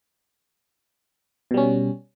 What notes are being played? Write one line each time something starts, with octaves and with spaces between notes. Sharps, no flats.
B2 G3 C#4